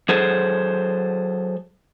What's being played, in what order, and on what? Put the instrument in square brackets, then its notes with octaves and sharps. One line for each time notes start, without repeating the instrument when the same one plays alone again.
[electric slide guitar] F#3 G#4 A4 C5